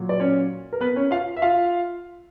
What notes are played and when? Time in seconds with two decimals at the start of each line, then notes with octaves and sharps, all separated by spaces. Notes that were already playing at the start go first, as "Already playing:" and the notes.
Already playing: A#2 F#3
0.09 D5
0.20 C#4 C#5
0.73 A#4
0.81 B3 B4
0.96 C#4 C#5
1.11 F4 F5
1.37 E5
1.42 F4 F5